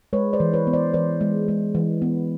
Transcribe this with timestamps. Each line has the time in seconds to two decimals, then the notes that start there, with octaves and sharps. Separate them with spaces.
0.13 G#3 B4 C#5
0.33 C5 D5
0.40 E3
0.53 B4 C#5
0.67 B3
0.73 C5 D5
0.94 E3 C5 D5
1.21 G#3
1.48 G#3
1.75 E3
2.02 B3